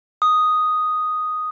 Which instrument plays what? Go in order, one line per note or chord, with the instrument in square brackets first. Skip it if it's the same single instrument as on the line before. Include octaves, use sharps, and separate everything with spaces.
[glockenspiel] D#6